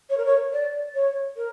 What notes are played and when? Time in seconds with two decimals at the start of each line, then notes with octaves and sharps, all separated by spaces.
0.10 C#5
0.17 A#4
0.26 C#5
0.53 D5
0.95 C#5
1.37 A#4